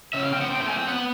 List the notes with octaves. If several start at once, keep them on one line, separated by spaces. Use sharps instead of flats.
C#3 E5
F5
C4 G5
F#5
A3 G5
G5
C4 G#5
G5
B3 F#5